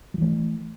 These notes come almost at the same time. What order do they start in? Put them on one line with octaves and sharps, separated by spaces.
F#3 E3 A3